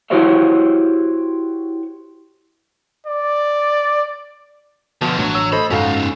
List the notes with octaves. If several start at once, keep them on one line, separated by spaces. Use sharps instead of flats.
E4 F#4 G4 C5 C#5 E5
D5
B2 D3 F3 A5
A1 F#3 A3 D4
C#5 E6
A4 C5 D#5 B5
F#1 G#2 C#4 D#4 F#4 A4 F5